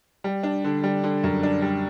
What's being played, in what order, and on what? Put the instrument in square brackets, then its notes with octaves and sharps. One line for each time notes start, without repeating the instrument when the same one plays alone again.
[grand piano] G3
D4
D3
G3
D3
F#2
D4
G3